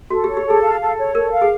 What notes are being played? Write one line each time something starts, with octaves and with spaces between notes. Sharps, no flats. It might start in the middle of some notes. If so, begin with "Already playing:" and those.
F#4 A4
G4
C#5
G4
G#4 A4
F5
A4
C#5
A4 A#4
F5
G#4